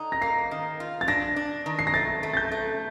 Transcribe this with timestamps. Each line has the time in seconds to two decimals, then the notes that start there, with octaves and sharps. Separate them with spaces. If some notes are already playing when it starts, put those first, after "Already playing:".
Already playing: D3 D#4
0.12 A#6
0.22 A#3 C7
0.51 D#3
0.80 F4
1.01 A6
1.08 D4 A#6
1.36 D4
1.66 D#3
1.79 C7
1.87 A#6
1.94 A3 A6
2.23 A3
2.33 A6
2.37 G6
2.52 A3